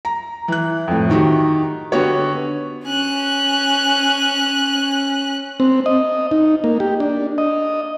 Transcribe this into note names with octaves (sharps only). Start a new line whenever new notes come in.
A#5
E3 F#6
F2 A2
D#3 D#4 F#4 G4
D3 B3 F#4 G4 C#5
C#4 F#6
C4
D#5
D#4
A#3
G4
D4
D#5